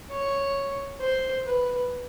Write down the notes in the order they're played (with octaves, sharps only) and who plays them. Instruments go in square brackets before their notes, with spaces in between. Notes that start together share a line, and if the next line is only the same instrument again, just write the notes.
[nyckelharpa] C#5
C5
B4